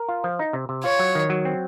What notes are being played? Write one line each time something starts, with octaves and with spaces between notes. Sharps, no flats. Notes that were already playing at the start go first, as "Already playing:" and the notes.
Already playing: A#4
F4
F3
D#4
C3
C3
F4 C#5
F#3
D#3
F#3
C4